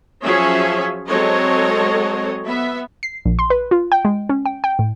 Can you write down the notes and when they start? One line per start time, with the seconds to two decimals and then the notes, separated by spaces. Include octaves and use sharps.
0.24 F3 F#3 C#4 G#4 C#5 E5
1.08 F#3 G#3 C4 A4 C#5 D#5
2.46 B3 E5
3.03 C7
3.25 A#1
3.39 C6
3.50 B4
3.71 F4
3.92 G5
4.05 G#3
4.29 C#4
4.46 G5
4.64 G5
4.79 A2